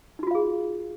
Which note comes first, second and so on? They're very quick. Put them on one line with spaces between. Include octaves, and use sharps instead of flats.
D#4 F#4 F4 F5 G#4